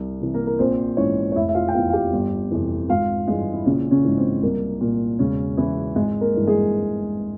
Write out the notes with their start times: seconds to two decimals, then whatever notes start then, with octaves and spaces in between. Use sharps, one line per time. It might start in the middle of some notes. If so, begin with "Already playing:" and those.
Already playing: C2
0.20 C3 E3
0.34 A#3 A#4
0.47 A#4
0.59 A#1 C4 C5
0.97 G#2 E3 C#4 C#5
1.32 C#5
1.36 F1 E4 E5
1.49 E5
1.55 F4 F5
1.68 G5
1.74 E2 F4 F5
1.79 E3
1.89 F5
1.93 G4 G5
2.13 G1
2.51 F2 C3 E3
2.89 G#1 F4 F5
3.27 G2 E3 G#3 G#4
3.54 E4
3.66 A#1 C#3 C#4
3.91 C#3 C#4
4.05 G#2 E3
4.18 C4
4.42 C2 A#3
4.81 A#2
5.19 E1 C#3 C#4
5.57 E2 C#3 E3 E4
5.96 G#1 G#3 G#4
6.21 A#3 A#4
6.34 G2 E3
6.47 G#3 G#4